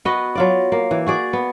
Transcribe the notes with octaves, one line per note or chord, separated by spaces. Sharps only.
B3 F#4 B4 D#5
F#3 F4 D5
A#3
E3
F#4 G#4 D5
B3